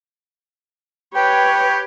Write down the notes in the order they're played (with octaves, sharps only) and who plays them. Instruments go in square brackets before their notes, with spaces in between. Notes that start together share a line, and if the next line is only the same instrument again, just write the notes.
[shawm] G4 [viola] B4 C#5 [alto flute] G5